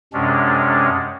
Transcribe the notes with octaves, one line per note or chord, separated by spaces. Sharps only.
F#2 C3 G#3 C#4 D4